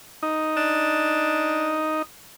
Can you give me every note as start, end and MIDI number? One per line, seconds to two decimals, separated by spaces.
0.23 2.02 63
0.57 1.83 62